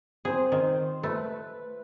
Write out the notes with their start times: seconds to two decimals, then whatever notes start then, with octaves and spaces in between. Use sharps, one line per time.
0.25 C4 G#4 C5
0.52 D#3
1.03 A3 B4